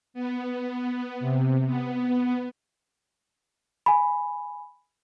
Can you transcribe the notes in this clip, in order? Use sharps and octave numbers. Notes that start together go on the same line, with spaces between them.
B3
C3
B3
G#5 B5